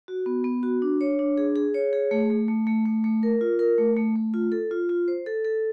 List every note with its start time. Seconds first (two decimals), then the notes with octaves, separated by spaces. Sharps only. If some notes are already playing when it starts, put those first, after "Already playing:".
0.08 F#4
0.26 B3
0.44 B3
0.63 F#4
0.82 D4
1.01 C#5
1.19 D4
1.38 G#4
1.56 G#4
1.74 C#5
1.93 G#4
2.11 A3
2.30 A3
2.48 A3
2.67 A3
2.86 A3
3.04 A3
3.23 A#4
3.41 F4
3.59 A#4
3.78 A3
3.96 A3
4.15 A3
4.34 F4
4.52 A4
4.71 F4
4.89 F4
5.08 C5
5.26 A4
5.45 A4